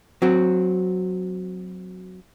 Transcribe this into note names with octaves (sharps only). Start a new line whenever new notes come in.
F#3 C4 F#4